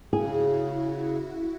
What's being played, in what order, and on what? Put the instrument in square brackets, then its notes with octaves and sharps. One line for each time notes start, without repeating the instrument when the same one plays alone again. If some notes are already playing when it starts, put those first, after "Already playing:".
[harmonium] C#3 [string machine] E4 F#4 [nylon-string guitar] G#4